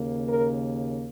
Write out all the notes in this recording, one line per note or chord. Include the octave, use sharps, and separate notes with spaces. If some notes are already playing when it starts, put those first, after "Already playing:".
Already playing: D#2 C#3 A#3
A#4